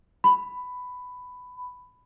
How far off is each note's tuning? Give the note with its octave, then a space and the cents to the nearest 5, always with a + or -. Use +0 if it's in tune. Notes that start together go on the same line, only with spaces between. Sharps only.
B5 +10